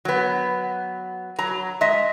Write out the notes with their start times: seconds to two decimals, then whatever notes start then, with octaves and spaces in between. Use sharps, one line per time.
0.05 F#3 B3
1.39 F#3 A#5
1.81 G#3 D#5 E5